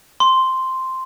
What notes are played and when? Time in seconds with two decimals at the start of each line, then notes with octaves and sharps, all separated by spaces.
0.20 C6